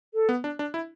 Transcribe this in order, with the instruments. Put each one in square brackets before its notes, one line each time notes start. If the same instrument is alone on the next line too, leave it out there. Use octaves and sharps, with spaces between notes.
[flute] A4
[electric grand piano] B3
D4
D4
E4